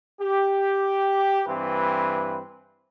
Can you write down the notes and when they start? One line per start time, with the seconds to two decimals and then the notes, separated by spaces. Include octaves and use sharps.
0.21 G4
1.47 G2 E3 C4 B4